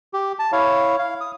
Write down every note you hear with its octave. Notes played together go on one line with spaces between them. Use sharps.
G4
A5
E4 C#5 F5
F5
D#6